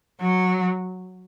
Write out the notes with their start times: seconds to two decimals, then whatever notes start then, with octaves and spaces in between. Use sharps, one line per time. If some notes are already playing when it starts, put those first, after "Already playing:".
0.21 F#3